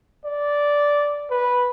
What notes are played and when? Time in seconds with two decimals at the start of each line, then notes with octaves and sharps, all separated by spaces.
0.25 D5
1.30 B4